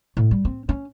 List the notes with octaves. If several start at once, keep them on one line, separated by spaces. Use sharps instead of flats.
A2
G3
C4
C#4